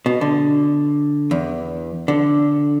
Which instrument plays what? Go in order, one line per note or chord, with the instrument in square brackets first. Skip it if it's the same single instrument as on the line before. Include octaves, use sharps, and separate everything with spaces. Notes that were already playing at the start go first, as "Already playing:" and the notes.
[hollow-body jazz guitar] B2
D3
E2
D3